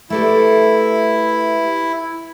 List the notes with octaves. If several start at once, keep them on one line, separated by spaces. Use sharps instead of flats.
A3 E4 G4 A4 B4 D5 E5